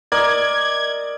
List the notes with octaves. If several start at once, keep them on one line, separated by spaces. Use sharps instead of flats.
A#4 D5 D#5 G#6